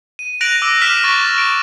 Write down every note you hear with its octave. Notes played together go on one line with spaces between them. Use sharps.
D#7
F#6 A#6 D7 F7 F#7
D6 E6
F6 B6 D7 E7
C#6 A6
D7